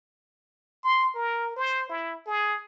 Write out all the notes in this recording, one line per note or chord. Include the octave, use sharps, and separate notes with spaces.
C6
A#4
C5
E4
G#4